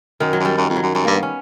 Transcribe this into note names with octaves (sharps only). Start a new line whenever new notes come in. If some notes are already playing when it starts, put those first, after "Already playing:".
F#2 D#3
F#3
F#2
G3
F#2
F2
F#3
F#2
F#2 G3
G2 A#3
B3
C#4